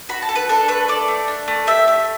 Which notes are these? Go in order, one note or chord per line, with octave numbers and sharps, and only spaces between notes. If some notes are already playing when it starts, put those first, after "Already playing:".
F#4 B5
A5
A4
B4
D4 A4
A3 B4
A4 D5
A3
D4
A3
G4 E5
A3 E5